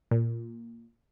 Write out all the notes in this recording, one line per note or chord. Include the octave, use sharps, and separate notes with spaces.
A#2